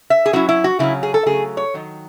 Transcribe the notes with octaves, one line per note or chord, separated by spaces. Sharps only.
E5
G#4
F#3 C#4 E4 F#4
E4
F#4
C#3 F#3 C#4 E4
G#4
A4
C#3 F#3 A3 G#4
C#5
D#3 F#3